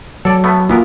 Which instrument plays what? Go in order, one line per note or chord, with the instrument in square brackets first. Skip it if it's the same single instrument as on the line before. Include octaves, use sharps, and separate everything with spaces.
[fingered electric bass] F#3 [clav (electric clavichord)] A4 D5
[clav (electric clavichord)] A3 B3
[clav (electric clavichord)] E3 B3 A#4 [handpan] A#3 F4 F#4